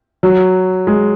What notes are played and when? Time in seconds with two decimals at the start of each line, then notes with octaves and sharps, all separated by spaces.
0.23 F#3
0.87 G#3